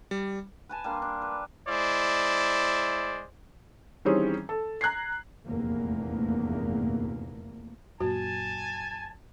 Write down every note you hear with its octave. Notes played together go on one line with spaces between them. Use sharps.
G3
B4 G#5 A5
G3 A#3 D4 C6
D4
B4
G#3 E4 C5 D5
D#3 E3 G3 C4 C#4 G#4
A4
A#5 F#6 G#6 C7
F1 A#1 E2 G2 A3 A#3
F#2 A#2 F#4 G#5 A5